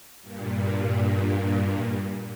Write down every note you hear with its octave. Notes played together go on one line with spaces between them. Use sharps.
G2 A#2